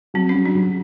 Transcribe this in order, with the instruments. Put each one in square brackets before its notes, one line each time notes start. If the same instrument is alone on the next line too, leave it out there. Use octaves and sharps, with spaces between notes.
[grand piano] F#3 [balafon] C4
[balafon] C#4
[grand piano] F#3
[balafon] D4
[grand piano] F#3